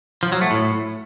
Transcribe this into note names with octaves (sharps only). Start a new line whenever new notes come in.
F3
F#3
A3
A2